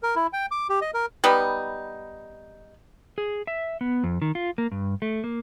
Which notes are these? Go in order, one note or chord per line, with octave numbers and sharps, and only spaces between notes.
A#4
E4
G5
D6
G4
D#5
A#4
G3 B3 D#4
G#4
E5
B3
F2
D#3
F4
A#3
G2
A3
A#3